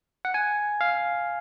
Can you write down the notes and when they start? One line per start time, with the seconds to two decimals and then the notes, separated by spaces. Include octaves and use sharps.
0.25 F#5
0.34 G#5
0.81 F5